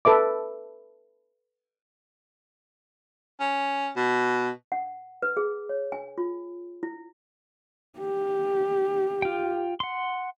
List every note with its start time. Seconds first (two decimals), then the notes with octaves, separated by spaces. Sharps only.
0.05 A4 B4 E5 D6
3.40 C#4
3.96 B2
4.72 F#5
5.22 B4
5.37 G#4
5.69 C#5
5.92 G#5
6.18 F4
6.83 E4
7.99 G4
9.22 F4 G5
9.80 F#5 C6